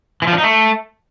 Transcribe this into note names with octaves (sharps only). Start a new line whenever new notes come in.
E3
F3
D4
D#4
A3